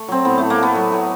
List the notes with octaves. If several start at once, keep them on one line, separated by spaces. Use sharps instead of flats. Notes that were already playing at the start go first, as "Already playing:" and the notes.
Already playing: A3
F#3 C4
A2 B3
A2 A3
A#3
A3 B3
F#3
A2